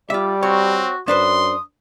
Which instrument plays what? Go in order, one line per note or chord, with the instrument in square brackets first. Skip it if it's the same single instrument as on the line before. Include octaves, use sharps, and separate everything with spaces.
[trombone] G3 [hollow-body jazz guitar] F4 E5 [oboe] D5
[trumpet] C4 [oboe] F#4 [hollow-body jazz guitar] C#5
[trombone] F#2 [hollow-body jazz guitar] D4 B4 C5 [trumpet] C6 [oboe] D#6